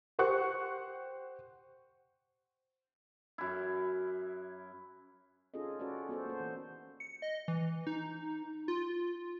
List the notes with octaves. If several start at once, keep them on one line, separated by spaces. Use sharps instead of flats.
G4 C5 F#5 C#6 F#6
F#2 E4
C#4 D#4 F4 G#4 A4 D#5
C#4 F#4 A4 B4 D5 D#5
B3 F#4 A4 C5
A#3 C5
E3
C#7
D#5
E3
D#4
F4